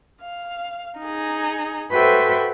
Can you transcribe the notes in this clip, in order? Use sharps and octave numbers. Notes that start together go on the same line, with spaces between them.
F5
D#4 G#4
F#4 A4 B4 C5 E5 G5